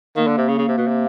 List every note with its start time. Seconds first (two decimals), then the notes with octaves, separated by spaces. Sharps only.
0.16 D#3 A#3
0.27 D3
0.38 C3
0.48 C#3
0.59 C#3
0.68 C3
0.78 B2
0.87 C3